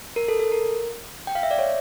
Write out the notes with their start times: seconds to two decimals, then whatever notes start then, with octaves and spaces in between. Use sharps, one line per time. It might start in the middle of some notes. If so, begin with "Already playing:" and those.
0.16 A#4
0.28 A4
0.40 A4
0.52 A#4
1.27 G5
1.35 F5
1.43 E5
1.51 D5
1.59 C#5